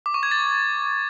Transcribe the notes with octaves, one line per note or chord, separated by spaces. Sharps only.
D6
C#6
G#6
A6